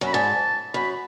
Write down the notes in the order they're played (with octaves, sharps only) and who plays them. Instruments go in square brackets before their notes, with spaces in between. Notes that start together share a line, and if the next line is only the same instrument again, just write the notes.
[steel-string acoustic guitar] F#2
[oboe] B5
[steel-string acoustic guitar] G#2 [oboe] A5
[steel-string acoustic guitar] F#2 [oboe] B5